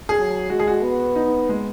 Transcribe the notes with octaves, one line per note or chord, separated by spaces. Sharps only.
G#4
F#3
G#3 F#4
G#4
F#4
B3
D#4
G#3